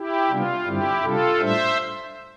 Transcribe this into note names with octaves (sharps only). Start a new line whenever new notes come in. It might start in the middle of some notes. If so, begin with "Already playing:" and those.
Already playing: E4 G4
C3 G3 B3 D4 F4
G2 D3 G3 C4 E4 G4
C3 G3 D4 F4 A4
A2 G3 D4 C5 E5